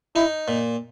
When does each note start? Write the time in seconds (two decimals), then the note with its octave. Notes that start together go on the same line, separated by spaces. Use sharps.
0.16 D#4 E4
0.48 A#2